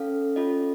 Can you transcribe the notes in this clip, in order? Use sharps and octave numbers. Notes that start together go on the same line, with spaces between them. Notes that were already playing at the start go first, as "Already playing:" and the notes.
Already playing: C#4 A4 F5
C#4 F4 A4 D#5